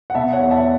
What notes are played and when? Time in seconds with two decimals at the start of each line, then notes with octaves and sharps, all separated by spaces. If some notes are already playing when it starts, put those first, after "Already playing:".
0.10 F#5
0.14 B2 E5 A5
0.33 C#5 F#5
0.39 E2
0.51 E5 A5